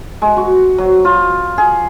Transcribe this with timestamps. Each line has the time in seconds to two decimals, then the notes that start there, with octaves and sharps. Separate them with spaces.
0.22 G#3
0.37 F#4
0.78 F#3
1.05 F4
1.58 G#4